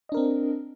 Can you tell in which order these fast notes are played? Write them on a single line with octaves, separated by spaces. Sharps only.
D#5 D4 A#4 C4